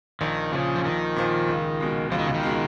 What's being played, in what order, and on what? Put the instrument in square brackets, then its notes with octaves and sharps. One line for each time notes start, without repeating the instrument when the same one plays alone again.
[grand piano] A#1 [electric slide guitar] D#3
[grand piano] A#2 F3 [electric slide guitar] C#3
[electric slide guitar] F3
[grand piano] A#1 [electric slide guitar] D#3
[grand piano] A#2 F3
C#2
B2 G#3
[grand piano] C#2 [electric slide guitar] F3
[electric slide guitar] D#3
C#3
D#3
[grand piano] B2 G#3